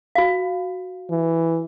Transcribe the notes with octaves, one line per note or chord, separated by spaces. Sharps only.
F#4 F5
E3